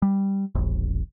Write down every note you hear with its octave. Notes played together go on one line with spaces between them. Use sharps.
G3
E1 A#1